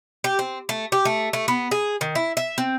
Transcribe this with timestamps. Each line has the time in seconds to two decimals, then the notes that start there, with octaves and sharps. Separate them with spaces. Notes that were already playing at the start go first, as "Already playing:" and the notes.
0.24 G4
0.39 C4
0.69 A3
0.92 G4
1.05 A3
1.33 A3
1.48 B3
1.71 G#4
2.01 D#3
2.15 E4
2.37 E5
2.58 C4